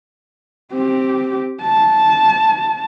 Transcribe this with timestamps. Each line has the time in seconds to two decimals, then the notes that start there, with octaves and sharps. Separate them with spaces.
0.72 C4 G4
1.62 A5